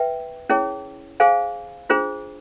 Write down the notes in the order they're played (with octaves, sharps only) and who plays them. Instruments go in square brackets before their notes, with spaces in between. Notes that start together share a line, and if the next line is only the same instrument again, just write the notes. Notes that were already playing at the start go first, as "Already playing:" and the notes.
Already playing: [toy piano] B4 E5 G5
C#4 E4 G#4 C#5
G#4 C5 F5 G#5
D4 F4 G#4 C5